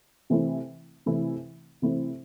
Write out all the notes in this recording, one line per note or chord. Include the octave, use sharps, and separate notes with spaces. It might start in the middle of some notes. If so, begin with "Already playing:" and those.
C3 E3 A3 C4 E4
C3 E3 A3 C4 E4
C3 E3 A3 C4 E4